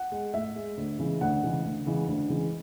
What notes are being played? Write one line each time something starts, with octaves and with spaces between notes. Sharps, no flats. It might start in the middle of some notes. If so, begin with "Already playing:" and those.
Already playing: F#5
G#3
A2 E5
G#3
D2
C#3 E3 G#3
D2 F#5
C#3 E3 G#3
D2
C#3 E3 G#3
D2
C#3 E3 G#3